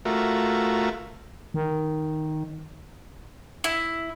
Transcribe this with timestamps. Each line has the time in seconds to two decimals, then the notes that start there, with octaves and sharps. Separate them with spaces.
0.05 A3 F4 F#4 A#4 E5
1.54 D#3
3.64 E4